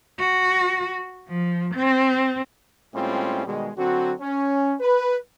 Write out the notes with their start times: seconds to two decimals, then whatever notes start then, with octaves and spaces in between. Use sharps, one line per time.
0.20 F#4
1.29 F3
1.75 C4
2.95 A2 G3 G#3 C4 C#4 F4
3.46 B2 D#3 G3 G#3
3.77 D3 F#3 C4 F#4
4.20 C#4
4.80 B4